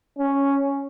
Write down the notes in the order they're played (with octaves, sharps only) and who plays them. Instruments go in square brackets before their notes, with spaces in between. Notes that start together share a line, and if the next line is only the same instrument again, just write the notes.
[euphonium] C#4